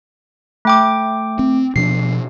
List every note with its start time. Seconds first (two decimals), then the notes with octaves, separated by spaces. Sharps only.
0.65 A3 G5 D6
1.39 C4
1.76 B2 F3 D4 C7